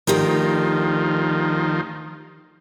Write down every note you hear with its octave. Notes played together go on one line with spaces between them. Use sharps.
D2 D#3 F3 G4 A#4